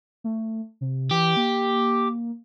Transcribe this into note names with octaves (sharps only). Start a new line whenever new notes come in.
A3
C3
E3 G4
A#3